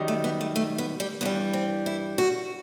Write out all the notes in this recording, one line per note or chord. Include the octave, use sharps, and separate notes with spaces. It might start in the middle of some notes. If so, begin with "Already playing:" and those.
Already playing: F#2 D#3 G3
A3
B3
A3
A3
B3
G3
G2 E3 G3 B3
C4
E4
F#4